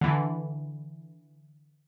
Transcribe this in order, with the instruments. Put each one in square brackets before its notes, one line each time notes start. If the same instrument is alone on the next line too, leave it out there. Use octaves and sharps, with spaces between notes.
[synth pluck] D3 E3